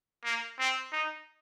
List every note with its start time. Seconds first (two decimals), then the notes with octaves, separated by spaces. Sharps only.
0.24 A#3
0.59 C4
0.92 D#4